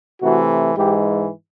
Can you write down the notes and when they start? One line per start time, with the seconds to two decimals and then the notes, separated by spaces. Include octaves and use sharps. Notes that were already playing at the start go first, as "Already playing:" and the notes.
0.21 C3 E3 A3 F#4
0.75 G#2 E3 G#3 G4